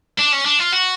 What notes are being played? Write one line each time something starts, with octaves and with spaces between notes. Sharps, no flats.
D4
C#4
D4
F4
F#4